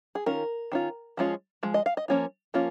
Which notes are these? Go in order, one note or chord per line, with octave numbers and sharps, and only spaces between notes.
G#4
D#3 C#4 F4 A#4
D#3 C#4 F4
F3 G#3 C#4 F4
F3 G#3
D#5
F5
D#5
F3 A#3 C#4 F4
F3 A#3 C#4 F4